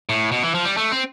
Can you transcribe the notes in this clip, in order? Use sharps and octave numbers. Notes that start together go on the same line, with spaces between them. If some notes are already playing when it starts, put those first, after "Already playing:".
A2
B2
E3
F3
G3
A3
C4